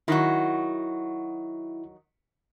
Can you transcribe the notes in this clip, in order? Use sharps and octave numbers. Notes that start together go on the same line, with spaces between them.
D#3 F#3 E4 F#4